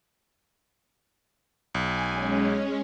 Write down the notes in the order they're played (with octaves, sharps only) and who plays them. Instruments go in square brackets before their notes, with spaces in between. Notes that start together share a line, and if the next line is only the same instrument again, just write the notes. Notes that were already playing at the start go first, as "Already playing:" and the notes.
[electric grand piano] B1 [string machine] G#5
[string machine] G#3 C#4